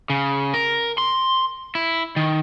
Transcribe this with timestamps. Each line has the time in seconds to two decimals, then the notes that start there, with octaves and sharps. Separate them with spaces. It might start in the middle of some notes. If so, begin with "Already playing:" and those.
0.10 C#3
0.54 A#4
0.98 C6
1.75 E4
2.16 D#3